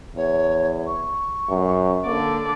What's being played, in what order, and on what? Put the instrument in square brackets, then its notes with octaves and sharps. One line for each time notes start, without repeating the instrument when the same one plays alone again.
[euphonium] E2 [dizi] C#5
[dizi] C#6
[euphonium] F#2
[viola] D3 D5 [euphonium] A#3